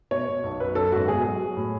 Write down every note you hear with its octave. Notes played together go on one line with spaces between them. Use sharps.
B2 C#5
B2
B1
F#2 B4
F#2 A4
G#1 F#4
B2 G#4
F#3
F#3
A2